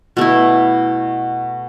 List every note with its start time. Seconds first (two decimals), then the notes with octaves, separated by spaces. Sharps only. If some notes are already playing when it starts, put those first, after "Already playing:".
0.17 B2 A3 E4